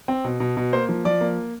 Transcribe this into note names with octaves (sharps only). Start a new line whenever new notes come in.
C4
B2
B2
B2
A#3 C5
F3
F3 D5
A#3